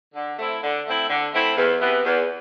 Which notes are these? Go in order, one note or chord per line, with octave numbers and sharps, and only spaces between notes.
D3
A3 C4 E4
D3
A3 C4 E4
D3
A3 C4 E4
E2
C3 E3 B3
E2